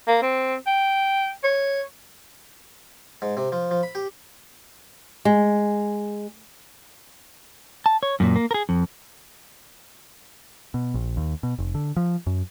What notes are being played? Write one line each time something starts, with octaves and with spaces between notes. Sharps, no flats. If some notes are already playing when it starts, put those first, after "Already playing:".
A#3
C4
G5
C#5
G#2
C3
F3
F3
B5
G4
G#3
A5
C#5
F#2 A#2
A#3
G#4 A#4
F2
B2
A#1
D#2
B2
F1
D3
F3
F#2